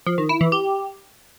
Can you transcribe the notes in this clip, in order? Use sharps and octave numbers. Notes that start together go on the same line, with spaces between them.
F3
D#3
E4
E3
G4